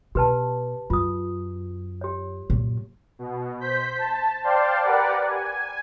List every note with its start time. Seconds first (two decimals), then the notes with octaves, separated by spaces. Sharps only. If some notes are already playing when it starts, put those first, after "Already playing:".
0.15 B2 G4 B4 A5
0.90 F#2 F4 D#6
2.01 G4 C#5
2.50 F#2 A#2
3.19 B2
3.60 C5 G6 B6
3.98 A5
4.44 C5 D5 F5 G5 A5 C6
4.83 G4 A#4 B4 D5 F#5
5.27 G#5